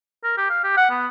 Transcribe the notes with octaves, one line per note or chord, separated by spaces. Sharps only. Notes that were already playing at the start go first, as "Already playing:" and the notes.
A#4
G4
F5
G4
F#5
B3